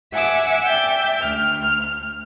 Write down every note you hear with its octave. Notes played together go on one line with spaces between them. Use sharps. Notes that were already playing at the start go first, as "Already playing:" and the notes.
E5 F#5 G#5 D6 E6
D5 E5 G5 D6 E6
D2 F6